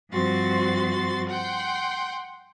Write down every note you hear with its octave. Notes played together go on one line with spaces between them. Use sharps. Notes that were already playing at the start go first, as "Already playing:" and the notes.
G2 F3 C4 F#4 C6 A6
F#5 G5 C6